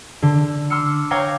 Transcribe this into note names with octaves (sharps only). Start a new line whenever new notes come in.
D3
C6 D6 E6 F6 C#7
C#5 F5 G5 A#5 D6 A#6